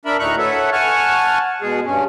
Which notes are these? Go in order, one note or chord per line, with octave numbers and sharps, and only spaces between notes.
D4 A#4 E5 B5
D2 A2 D#4 A#5 C#6 F#6
A4 B4 C#5 E5 F#5
F#5 G#5 A5 C#6 F6
B2 G#3 G#4
G2 C#4